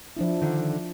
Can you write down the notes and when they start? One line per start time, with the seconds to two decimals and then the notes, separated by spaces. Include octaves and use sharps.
0.17 F3 D4 E4
0.42 D3 D#3